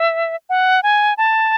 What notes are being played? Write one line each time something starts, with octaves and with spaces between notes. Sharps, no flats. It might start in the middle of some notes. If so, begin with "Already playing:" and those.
Already playing: E5
F#5
G#5
A5